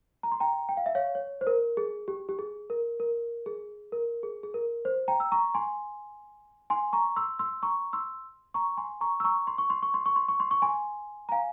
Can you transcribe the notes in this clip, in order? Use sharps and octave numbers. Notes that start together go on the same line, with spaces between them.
A#5
C6
G5 A#5
G5
F5
E5
C#5 F5
C#5
C5
A#4
G#4
G4
G4
G#4
A#4
A#4
G#4
A#4
G#4
G#4
A#4
C5
G5 A#5
E6
A#5 C#6
G#5 C6
G#5 C6
A#5 C#6
C6 E6
C6 E6
A#5 C#6
C6 E6
A#5 C#6
G#5 C6
A#5 C#6
E6
A#5 C#6
C6
C#6
C6
C#6
C6
C#6
C6
C#6
C6
C#6
G#5 C6
A#5
F5 G#5